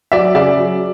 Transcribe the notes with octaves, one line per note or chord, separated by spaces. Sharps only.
F#3 D5 E5
C#3 D5 E5
F#3